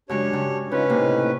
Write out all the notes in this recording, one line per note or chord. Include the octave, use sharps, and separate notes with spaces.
F#2 C#3 G#3 D4 G4 C#5
G2 C#3
C#3 C#4 D#4 F4 B4 C5
A2 C3 A#3 D#4